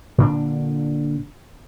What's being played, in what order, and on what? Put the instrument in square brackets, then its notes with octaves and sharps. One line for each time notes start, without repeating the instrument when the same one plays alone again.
[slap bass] A#2 D3 D4